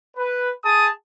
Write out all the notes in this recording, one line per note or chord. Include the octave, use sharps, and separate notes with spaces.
B4
G#4 A5 D#6